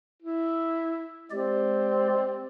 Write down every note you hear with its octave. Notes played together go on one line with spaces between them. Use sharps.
E4
G#3 C4 G4 D5